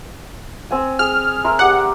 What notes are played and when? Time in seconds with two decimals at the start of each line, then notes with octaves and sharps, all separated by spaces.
0.71 C4 G#5
0.99 G#4 F6
1.44 A#4 E5 C6
1.59 G4 D5 F#5